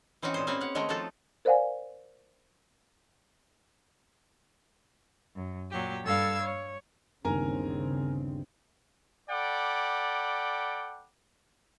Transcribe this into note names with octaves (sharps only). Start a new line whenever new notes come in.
E3 C4 C#4 D#4 F#4
A#2 G#4 C5
A#3 C4 C#4 F#4 B4
F5 F#5
D#3 G#3 A3 F#4 A#4
F3 D#4 F4 F#4 A4
A#4 C5 D5 F5 F#5 G#5
F#2
A#2 F#3 G4
G2 G3 A4 F5 E6 G#6
C#5
G1 D#2 C#3 C4 A#4 G#5 A#5
A4 D5 F#5 G5 B5 D6